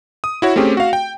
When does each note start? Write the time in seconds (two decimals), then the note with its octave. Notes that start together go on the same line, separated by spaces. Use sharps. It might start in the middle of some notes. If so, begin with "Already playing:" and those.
0.24 D#6
0.42 E4 F#4 C#5
0.56 A3 C4 C#4 G4 G#4
0.77 F#4 F5
0.93 G5